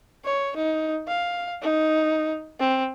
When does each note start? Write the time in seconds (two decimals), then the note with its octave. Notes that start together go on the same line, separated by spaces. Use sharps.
0.25 C#5
0.56 D#4
1.08 F5
1.62 D#4
2.60 C4